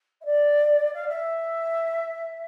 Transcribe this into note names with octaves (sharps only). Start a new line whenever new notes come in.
E5
D5
F5
E5